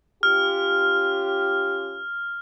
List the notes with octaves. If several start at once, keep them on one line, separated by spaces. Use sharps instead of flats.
C#4 F4 G4 F6